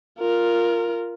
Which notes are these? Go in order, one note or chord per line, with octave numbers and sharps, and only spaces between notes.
F4 A#4